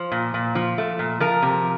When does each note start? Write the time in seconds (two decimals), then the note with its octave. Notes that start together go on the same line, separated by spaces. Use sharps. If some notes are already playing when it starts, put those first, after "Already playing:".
Already playing: F3 C5
0.12 A#2
0.34 A#2
0.55 F3
0.78 A3
0.99 A#2
1.20 F3 A#4
1.42 C3